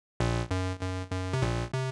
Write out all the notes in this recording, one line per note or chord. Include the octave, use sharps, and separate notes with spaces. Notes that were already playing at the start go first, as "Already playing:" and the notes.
A#1 A#2
F#2
F#2
F#2
C3
A#1 A#2
C3